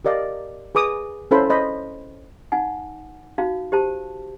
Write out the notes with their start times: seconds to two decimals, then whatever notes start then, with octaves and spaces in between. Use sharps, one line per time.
0.05 G4 A#4 D5 D#5 F5
0.75 G#4 B4 D6 D#6
1.31 C#4 E4 A4 C5 F5 B5
1.50 C5 D#5 B5
2.52 D#4 F#5 G#5
3.38 D#4 F#4 F5
3.72 G4 C5 A5